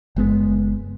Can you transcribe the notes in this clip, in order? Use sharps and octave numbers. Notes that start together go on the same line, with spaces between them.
F#1 G#3 B3